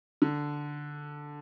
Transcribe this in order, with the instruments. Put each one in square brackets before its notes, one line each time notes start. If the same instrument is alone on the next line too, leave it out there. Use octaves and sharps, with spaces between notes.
[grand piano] D3